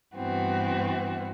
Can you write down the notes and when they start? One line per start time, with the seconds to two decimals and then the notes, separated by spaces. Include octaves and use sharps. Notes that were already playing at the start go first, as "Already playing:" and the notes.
0.16 G2 E3 B3 C4 F#4